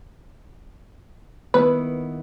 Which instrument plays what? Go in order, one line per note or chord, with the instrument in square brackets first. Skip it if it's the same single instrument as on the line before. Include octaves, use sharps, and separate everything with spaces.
[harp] D#3 B3 E4 [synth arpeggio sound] B4